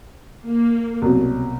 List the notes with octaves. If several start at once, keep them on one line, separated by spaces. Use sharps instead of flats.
A#3
C2 B2 F#3